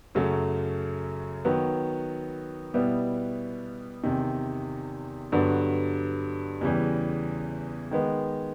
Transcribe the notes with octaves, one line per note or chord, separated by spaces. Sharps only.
F#2 C#3 F#3 A3
D#3 F#3 B3
B2 G3 B3 E4
E2 C3 D#3
G2 D3 F#3 B3
E2 C#3 E3 G3
D#3 G#3 B3